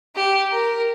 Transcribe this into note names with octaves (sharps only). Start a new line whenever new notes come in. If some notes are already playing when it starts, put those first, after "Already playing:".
G4
A#4